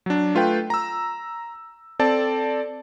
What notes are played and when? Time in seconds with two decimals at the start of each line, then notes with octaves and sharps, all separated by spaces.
0.06 F#3 D4
0.35 A3 F4 B4 G5
0.70 A#5 E6
1.99 C4 A4 D5 A5